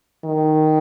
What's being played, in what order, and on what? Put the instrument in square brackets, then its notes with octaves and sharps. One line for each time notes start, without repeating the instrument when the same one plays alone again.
[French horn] D#3